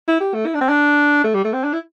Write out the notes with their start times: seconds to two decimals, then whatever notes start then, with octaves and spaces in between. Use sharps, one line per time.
0.08 E4
0.21 G4
0.34 A3
0.46 E4
0.55 D4
0.61 C4
0.69 D4
1.24 A3
1.35 G3
1.45 A3
1.54 C4
1.64 D4
1.73 E4